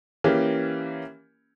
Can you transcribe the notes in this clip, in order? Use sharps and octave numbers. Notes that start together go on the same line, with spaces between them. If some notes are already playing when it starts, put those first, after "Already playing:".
E3 A#3 C#4 G4